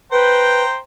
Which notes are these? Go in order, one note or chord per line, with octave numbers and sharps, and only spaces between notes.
B4 C5 G5 A#5